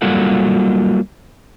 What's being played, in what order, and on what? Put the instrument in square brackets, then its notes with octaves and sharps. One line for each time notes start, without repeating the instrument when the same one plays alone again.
[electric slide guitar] F#3 G3 A#3 F4 A4 F#5